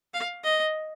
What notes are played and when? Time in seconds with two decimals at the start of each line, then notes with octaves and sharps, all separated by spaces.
0.14 F5
0.44 D#5